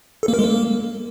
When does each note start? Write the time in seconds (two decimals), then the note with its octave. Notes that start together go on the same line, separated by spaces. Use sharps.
0.23 A4
0.28 A#3
0.34 A#4
0.39 G#3
0.44 A#3